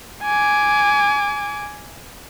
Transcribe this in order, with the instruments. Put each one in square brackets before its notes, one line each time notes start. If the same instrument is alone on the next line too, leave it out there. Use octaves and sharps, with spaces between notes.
[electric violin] G#5 D6